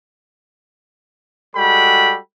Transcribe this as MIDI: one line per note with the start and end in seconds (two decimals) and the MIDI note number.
1.56 2.17 55
1.56 2.17 56
1.56 2.17 66
1.56 2.17 69
1.56 2.17 79
1.56 2.17 83